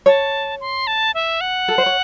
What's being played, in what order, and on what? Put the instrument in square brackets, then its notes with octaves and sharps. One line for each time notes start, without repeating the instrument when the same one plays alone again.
[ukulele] C#5 [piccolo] A5
[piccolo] C6
A5
E5
F#5
[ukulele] A4
C5
C#5